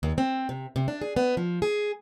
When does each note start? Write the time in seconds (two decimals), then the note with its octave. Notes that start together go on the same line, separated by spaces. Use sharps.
0.03 D#2
0.18 C4
0.49 C3
0.76 C3
0.88 D4
1.01 G#4
1.16 B3
1.37 F3
1.62 G#4